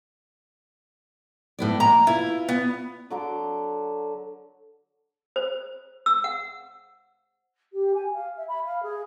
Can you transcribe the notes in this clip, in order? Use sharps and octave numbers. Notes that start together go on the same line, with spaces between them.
A2 B3 D5
A#3 A#5
E4 F4 B4
B3
D3 F#3 C6 D6
C5
E6
F#5
G4
G#5
F5
E5
B5
F5
G#4